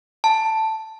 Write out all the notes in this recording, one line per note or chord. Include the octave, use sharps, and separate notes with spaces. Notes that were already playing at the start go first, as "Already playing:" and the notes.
A5